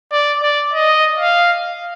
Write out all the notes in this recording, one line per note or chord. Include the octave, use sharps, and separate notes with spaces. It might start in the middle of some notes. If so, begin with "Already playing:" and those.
D5
D5
D#5
F5